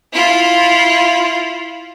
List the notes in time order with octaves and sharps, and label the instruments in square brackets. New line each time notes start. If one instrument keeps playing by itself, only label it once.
[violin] E4 F4